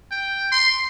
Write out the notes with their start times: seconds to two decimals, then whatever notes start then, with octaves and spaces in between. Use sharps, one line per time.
0.11 G5
0.52 C6